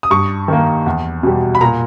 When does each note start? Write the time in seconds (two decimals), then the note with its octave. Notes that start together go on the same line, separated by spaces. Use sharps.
0.03 D#6
0.10 G2 C#6
0.48 D#3 A#3
0.86 E2
1.23 B2 G3
1.55 B5
1.61 A#2 A#5